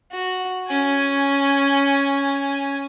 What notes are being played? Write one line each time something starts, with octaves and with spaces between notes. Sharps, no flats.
F#4
C#4 G#5